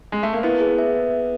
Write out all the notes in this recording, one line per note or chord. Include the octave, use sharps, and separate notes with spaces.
G#3
A3
A#3
B3 E4
G#4
E5